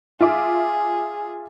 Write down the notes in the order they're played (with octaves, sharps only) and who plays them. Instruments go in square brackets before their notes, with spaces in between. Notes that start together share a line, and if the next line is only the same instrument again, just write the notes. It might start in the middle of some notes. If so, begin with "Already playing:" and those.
[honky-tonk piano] F4 E5 D6 [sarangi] G#4